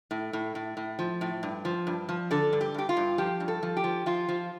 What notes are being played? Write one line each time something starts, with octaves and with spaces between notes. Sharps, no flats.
A2
A2
A2
A2
F3
A2
G2
F3
G2
F3
D3 A4
G2
G4
G2 G4
F4
G2
F3 G4
G2
A4
F3
G4
F3
F3 F4
F3